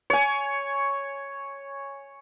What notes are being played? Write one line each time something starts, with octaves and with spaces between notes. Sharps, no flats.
C#5 G#5